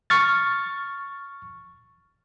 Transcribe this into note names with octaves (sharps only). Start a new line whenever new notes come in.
C#6 F6 A6